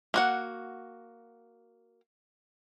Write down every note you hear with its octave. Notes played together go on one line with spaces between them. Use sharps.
A#3 F#4 F#5